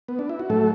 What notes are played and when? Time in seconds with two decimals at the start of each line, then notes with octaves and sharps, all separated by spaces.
0.08 B3
0.19 D4
0.29 E4
0.39 F#4
0.50 A2 F#3 A3 A4